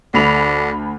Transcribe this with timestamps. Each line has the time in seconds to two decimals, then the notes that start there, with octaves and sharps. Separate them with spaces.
0.14 D2 D3 B5 F7